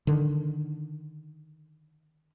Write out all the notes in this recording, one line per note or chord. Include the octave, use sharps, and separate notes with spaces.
D3 D#3